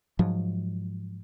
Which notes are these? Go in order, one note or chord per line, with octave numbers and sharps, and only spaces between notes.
G#2 F3 F#3